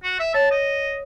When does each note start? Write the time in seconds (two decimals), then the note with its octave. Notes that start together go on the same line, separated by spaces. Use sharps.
0.03 F#4
0.20 E5
0.34 C#5 A5
0.51 D#5